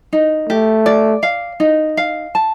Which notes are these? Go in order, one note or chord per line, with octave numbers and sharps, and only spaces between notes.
D#4
A3 G4
D5
F5
D#4
F5
A5